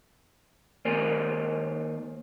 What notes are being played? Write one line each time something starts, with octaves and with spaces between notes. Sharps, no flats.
D#3 A#3 A#4 C5 D5 G#5